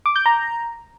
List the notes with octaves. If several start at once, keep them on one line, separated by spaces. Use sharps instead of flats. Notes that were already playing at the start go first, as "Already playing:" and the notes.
D6
G6
A#5